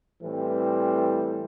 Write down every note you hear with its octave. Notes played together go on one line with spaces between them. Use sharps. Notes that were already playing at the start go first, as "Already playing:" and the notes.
A2 E3 G3 C4